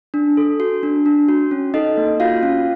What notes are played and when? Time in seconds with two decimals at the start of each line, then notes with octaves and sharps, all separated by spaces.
0.14 D4
0.37 A4
0.60 F#4
0.83 D4
1.06 D4
1.28 F#4
1.51 C#4
1.74 D#4 A4 D#5
1.97 A#3
2.20 F4 F#4 F5
2.43 C#4